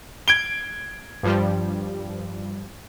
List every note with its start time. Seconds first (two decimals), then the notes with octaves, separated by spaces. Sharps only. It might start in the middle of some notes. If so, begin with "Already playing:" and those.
0.28 G#6 D7 G7
1.23 G2 F3 G3